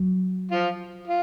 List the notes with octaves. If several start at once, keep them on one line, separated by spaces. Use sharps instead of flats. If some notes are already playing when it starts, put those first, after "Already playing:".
Already playing: F#3
F3 F4
F4